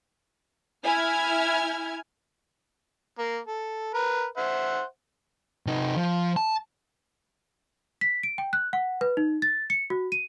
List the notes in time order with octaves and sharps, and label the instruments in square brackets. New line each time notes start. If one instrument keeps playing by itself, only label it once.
[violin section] E4 G#5 F6 G#6
[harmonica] A#3
A4
A#4 B4
C5 E5 F#5
[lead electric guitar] C3 D#4
F3
A5
[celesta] B6
D7
G5
F#6
F#5
B4
D#4
A6
C#7
F#4
D#7